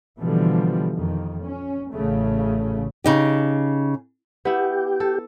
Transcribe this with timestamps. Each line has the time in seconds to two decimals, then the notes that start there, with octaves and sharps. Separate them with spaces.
0.21 B2 D3 E3 F3 G3
0.97 F2 D#3
1.44 C#4
1.93 A1 C#3 A3
3.04 C#3 D#4 G4
4.45 B3 E4 G4
5.00 A4